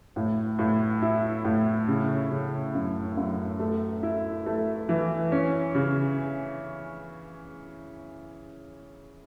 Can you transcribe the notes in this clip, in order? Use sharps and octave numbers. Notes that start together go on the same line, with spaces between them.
A2
A2
E4
A2
C#3
C#3
F#2
F#2
A3
E4
A3
E3
C#4
C#3